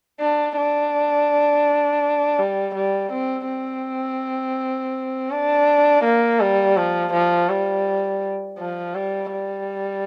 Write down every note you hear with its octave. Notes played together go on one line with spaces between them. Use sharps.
D4
D4
G3
G3
C4
C4
D4
A#3
G3
F3
F3
G3
F3
G3
G3